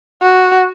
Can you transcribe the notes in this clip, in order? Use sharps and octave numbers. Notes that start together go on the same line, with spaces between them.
F#4